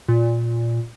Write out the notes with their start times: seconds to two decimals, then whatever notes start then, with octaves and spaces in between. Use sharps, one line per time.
0.08 A#2